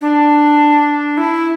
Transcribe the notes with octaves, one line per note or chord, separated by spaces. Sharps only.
D4
E4